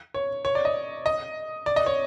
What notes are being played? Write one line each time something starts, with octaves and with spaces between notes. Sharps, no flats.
C#5
C#5
D5
D#5
D#5
D5
D#5
C#5